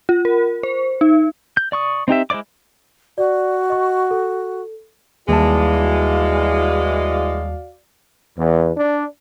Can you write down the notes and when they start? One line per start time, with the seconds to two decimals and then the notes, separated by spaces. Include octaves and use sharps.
0.09 F4
0.25 A#4
0.63 C5
1.01 D#4
1.57 G6
1.72 D5 C#6 D#6
2.08 C4 D#4 G4 E5
2.30 G#3 E4 C5 D5 D6
3.18 F#4 D5
3.70 D#5 C#6
4.11 A4
5.28 D#2 E3 G3 G#3 F#4 D5 F5 A5
8.38 E2
8.77 D4